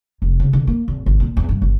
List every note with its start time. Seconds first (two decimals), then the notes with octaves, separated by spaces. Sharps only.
0.22 F1
0.40 C#3
0.53 D3
0.67 A#3
0.88 G#1
1.06 G#1
1.20 A#2
1.37 E2
1.49 G2
1.62 G1